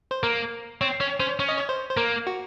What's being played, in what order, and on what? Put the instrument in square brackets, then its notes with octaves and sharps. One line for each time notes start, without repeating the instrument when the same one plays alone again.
[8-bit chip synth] C5
[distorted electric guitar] A#3 [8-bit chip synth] A#4
[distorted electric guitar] C4 [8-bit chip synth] C#5
[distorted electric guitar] C#4 [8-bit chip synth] C#5
[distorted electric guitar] C#4 [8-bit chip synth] C5
[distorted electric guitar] C#4 [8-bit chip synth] C#5
[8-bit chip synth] D#5
C#5
C5
C5
[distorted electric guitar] A#3 [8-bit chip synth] A#4
[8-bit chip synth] F#4